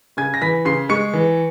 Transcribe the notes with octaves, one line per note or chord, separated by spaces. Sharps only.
C#3 G#5 G#6
A#6
E3 B5 B6
C#3 C6 C7
G#3 C#6 C#7
E3